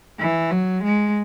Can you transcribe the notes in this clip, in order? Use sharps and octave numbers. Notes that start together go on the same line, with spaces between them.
E3
F#3
G#3